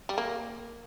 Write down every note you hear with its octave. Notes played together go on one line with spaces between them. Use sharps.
G3
A#3